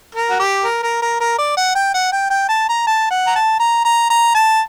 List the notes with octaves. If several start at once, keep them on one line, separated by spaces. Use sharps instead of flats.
A#4
F#4
G4
A#4
A#4
A#4
A#4
D5
F#5
G5
F#5
G5
G5
A5
A#5
A5
F#5
A#5
A5
A#5
A#5
A#5
A5